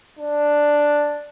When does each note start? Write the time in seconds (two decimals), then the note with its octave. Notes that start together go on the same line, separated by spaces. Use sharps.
0.19 D4